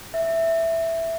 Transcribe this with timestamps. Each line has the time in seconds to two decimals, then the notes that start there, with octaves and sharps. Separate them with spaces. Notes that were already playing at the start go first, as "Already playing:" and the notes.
0.14 E5